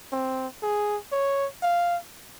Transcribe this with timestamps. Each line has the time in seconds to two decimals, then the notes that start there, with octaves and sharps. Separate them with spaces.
0.12 C4
0.62 G#4
1.12 C#5
1.63 F5